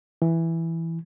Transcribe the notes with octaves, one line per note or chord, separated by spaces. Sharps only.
E3